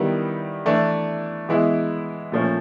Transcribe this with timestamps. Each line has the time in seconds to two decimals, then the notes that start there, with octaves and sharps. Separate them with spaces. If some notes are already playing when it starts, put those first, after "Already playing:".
Already playing: D#3 G3 B3 E4
0.66 E3 A3 D4
1.49 E3 G#3 B3 E4
2.32 A#2 F3 A3 C#4